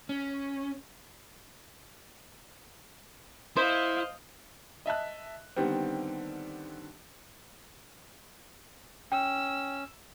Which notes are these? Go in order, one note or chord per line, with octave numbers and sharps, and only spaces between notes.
C#4
E4 C5 D#5 F5
D#5 E5 A5 F#6
D3 D#3 G3 B3 C4
C#4 G5 E6